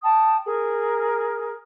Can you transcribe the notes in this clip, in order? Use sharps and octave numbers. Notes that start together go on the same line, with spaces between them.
G5 A5 D#6
G#4 A#4